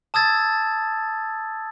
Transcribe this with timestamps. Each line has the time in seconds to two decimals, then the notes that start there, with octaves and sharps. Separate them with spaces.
0.14 A5 D#6 E6 G#6 A6